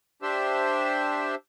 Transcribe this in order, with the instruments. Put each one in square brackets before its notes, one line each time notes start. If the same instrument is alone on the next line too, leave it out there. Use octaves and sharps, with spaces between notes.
[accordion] D4 G4 C5 E5